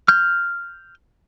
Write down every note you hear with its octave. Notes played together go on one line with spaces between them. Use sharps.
F6 G6